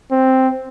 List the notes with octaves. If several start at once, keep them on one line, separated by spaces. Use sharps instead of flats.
C4